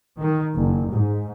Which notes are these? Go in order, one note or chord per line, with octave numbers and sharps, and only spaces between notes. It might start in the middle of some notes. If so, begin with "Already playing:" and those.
D#3
F#1
G#2